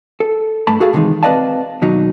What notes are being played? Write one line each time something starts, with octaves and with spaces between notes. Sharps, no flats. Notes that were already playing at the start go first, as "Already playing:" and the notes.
A4
G2 A3 A5 B5
F#4 G#4 A4 F5
C3 D#3 E3 G#3 D#4
C4 B4 D5 D#5 F5 A5
D#2 B2 F#3 D#4